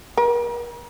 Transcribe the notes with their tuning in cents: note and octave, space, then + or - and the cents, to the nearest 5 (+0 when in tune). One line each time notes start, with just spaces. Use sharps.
A#4 +40